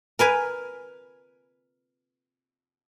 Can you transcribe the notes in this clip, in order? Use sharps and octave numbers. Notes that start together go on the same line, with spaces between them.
A#4 B4 G#5